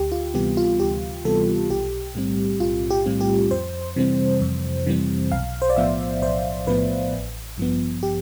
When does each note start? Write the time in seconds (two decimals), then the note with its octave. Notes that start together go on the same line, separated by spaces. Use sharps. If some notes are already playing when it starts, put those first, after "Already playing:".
Already playing: D2 G4
0.12 F4
0.34 C3 E3 G3 B3 G4
0.57 F4
0.80 D2 G4
1.25 C3 E3 G3 B3 A4
1.70 B1 G4
2.15 A2 G3 C4
2.60 B1 F4
2.90 G4
3.06 A2 G3 C4
3.21 G4
3.51 F2 C5
3.96 C3 E3 G3 C4
4.41 F2
4.87 C3 E3 G3 C4
5.32 B1 F5
5.62 C5
5.70 D5
5.77 A2 F3 B3 E5
6.22 B1 C5
6.67 A2 F3 B3 B4
7.13 A1
7.57 G2 F3 B3
8.03 G4